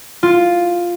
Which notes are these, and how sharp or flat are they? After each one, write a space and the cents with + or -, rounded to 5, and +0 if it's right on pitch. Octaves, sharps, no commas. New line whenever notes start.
F4 +0